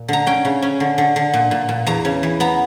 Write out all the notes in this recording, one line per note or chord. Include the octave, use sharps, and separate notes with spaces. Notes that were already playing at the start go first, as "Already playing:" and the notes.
Already playing: A#2
D3 A#5
C#4 G5
C#3
C#4
D3
D3
D3
A#2
A#2
A#2
E2 A#5
C#3
E3
B3 A#5